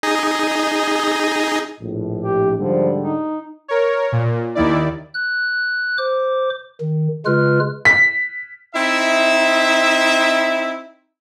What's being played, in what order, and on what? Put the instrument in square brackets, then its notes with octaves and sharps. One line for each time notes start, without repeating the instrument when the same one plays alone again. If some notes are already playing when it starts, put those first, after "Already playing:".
[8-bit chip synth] D#4 G#4 D#5
[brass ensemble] A#1 A2
[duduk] G4
[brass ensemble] G#2 D3 G3 [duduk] F3
[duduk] D#4
[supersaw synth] A#4 C#5
A#2
D#2 D#3 E4 D5
[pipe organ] F#6
C5 D6
D#3
C#3 G#3 F4 B4 F6
[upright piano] B6
[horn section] C4 D#4 E4 E5